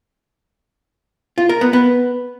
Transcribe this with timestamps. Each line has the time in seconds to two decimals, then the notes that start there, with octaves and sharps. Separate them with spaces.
1.38 F4
1.49 A#4
1.61 B3
1.73 B3